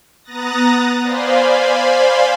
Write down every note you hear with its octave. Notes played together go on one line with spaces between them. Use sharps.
B3 A#5 D#6 F#6 A6 A#6
C5 D5 F5 G#5 B5 C6